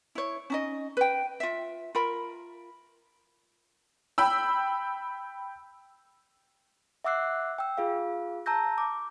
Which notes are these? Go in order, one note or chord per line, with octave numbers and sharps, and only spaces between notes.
E4 C#5
C#4 D#4 D#5
B4 G5
F4 E5
F4 A#4 B5
G5 B5 E6
E5 F#5 D6 E6 F#6 C7
G5 E6
F4 G#4 F5
A5 A#5 E6 G6 A#6
D6